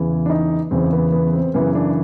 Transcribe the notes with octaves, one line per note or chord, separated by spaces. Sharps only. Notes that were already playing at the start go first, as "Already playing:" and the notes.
Already playing: E2 C#3 E3
D4
D#4
E2 C#3 E3 C4
B3
B3
C4
F#2 C#3 E3 B3
D4